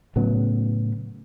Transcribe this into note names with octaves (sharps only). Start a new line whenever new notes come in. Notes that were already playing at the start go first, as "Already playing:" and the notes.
A2 C#3 F#3 B3